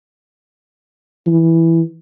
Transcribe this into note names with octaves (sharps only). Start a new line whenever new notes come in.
E3